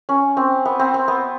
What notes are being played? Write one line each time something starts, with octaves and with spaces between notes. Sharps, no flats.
C#4
C4
B3
C4
C4
B3